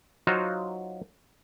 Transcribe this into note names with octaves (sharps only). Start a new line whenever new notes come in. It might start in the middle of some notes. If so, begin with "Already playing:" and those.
F#3 D#4 F4 F#4 C5 F5